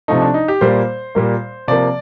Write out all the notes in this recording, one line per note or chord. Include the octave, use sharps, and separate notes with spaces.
C3 F3 A3 D#4
D4
D#4
G4
A#2 G3 A#3 C5
A#2 G3 A#3
C3 F3 A#3 D5